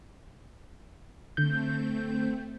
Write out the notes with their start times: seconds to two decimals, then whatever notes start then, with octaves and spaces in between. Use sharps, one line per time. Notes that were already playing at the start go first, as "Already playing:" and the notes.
1.37 D3 A3 C4 G6